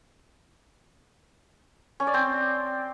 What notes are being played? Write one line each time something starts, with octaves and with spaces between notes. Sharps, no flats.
C#4
D5
C4